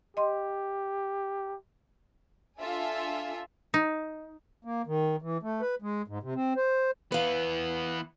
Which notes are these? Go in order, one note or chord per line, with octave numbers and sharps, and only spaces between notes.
G4 D#5 C6
D4 F4 A4 E5 G#5
D#4
A#3
D#3
E3
A3
B4
G#3
G#2
C3
C4
C5
E3 B3 B4 F5